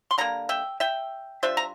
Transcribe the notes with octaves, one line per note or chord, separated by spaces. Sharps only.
C6
D3 G3 A#3 A#5
E5 G5
E5 G5
G3 D4 F4 C5 E5
A#5